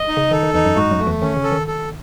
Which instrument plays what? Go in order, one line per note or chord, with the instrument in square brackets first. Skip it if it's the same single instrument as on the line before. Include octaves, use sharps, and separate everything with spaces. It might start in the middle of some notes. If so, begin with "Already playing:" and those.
Already playing: [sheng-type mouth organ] D#5
D#4
[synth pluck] C#3
[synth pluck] D#3 [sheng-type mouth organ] A4
[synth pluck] D#3
[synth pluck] E2 E3 [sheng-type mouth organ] D#4
[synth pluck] F#2 F#3
[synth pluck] G#2 G#3 [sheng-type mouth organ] F#4
[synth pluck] F#2 F#3
[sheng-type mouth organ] A3
[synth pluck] E2 E3
[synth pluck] D#3 [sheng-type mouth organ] C#4
[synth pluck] C#3
[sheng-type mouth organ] A4
[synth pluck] D#3
[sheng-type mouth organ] A4